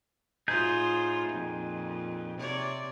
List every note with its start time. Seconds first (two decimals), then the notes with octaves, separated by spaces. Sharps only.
0.48 A2 D#4 F4 G#4 C5 G6
1.30 F2 A#2
2.38 C3 C#5 D5